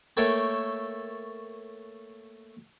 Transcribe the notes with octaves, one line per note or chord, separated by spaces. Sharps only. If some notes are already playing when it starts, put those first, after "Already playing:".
A3 A#3 A4 C#5 G5 A5